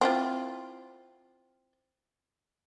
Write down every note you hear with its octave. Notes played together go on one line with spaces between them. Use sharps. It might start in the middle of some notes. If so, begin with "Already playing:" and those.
C4 E4 F4